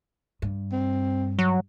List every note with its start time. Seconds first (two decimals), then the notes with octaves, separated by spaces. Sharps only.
0.42 G2
0.72 C4
1.39 F#3